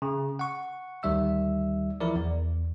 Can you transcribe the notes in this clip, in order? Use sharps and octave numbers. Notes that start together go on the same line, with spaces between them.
C#3
F#5 C#6
D2 D#3 G3 E5 E6
E3 F3 E4 A#4 D5
E2